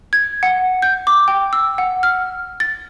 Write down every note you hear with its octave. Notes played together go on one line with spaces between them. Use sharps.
G#6
F#5
G6
D6
G5
E6
F#5
F6
A6